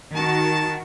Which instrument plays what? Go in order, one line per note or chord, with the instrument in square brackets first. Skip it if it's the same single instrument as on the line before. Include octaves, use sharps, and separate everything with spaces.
[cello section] D#3 F#4 [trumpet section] A5